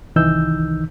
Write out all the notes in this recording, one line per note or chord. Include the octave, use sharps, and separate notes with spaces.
C2 D#3 E3 D#4 E6 G6